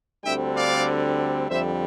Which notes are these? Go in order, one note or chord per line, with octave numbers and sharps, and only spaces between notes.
D2 D3 G3 C4 E5 G5
D5 F5
F2 D3 G3 C5 E5